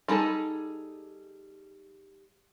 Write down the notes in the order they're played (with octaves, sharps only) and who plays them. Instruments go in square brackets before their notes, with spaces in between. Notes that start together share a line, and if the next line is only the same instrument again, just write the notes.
[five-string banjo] G3 D#4 G#4 A4